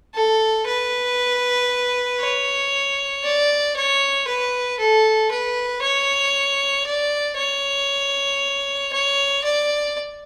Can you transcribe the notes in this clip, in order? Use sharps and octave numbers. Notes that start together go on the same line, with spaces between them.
A4
B4
C#5
D5
C#5
B4
A4
B4
C#5
D5
C#5
C#5
D5